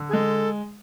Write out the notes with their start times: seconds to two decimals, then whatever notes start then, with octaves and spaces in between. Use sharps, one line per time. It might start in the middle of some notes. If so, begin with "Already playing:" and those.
Already playing: D3
0.09 G#4
0.13 G#3 A4